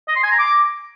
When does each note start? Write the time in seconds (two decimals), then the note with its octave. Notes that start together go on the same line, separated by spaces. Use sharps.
0.08 D#5
0.16 C6
0.23 G#5
0.31 A#5
0.39 D6